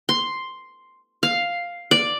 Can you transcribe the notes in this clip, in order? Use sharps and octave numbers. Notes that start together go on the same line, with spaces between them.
C6
F5
D5